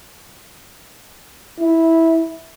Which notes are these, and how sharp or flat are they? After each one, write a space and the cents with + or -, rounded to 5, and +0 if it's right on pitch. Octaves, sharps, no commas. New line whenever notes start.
E4 -10